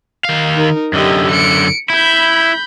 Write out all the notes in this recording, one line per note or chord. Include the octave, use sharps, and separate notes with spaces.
D#3 F5
D#4 A#4
F#2 D3 G4 D#5
C#7 D7
E4 B5 G6